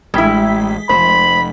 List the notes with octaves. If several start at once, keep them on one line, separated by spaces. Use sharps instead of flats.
A1 G3 G#3 E4 B6
F1 C5 B5